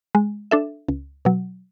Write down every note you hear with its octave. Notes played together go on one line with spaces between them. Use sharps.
G#3
D4 A4 E5
C#2
B2 F#3